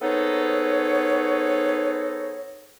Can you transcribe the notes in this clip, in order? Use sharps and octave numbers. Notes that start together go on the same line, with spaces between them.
B3 C4 D#4 G#4 A4 C#5